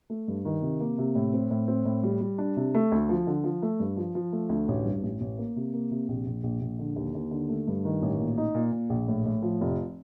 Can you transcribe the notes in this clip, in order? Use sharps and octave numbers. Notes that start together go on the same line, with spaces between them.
A3
G2
D#3
C3
A#3
C3
A2
C4
A2
C4
A2
G3
G3
D4
C3
A3
D2
F3
D3
F3
A3
G2
F3
F3
A3
D2
A1
G2
A1
A1
A#3
C3
A#3
C3
A#1
A#1
A#1
A#1
D3
D#2
D#2
D3
A3
G2
D#3
A1
A#2
D#4
A#2
A#2
A#1
A2
A2
F3
F1